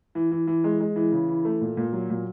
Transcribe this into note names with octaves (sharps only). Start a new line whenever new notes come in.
E3
E3
E3
G#3
G#3
E3
C#3
E3
A3
A#2
A#2
F#3
A#2